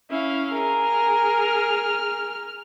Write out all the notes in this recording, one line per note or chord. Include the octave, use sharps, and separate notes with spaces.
C#4 E4 F5
G#4 A#4
F6